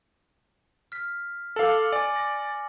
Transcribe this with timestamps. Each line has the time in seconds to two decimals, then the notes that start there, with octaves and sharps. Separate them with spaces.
0.92 F6 B6
1.56 A4 F5 D6 C#7 F#7
1.92 D5 G#5 A6
2.16 A#6